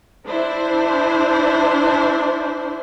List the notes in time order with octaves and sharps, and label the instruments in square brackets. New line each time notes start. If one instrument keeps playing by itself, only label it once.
[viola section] D4 E4 C5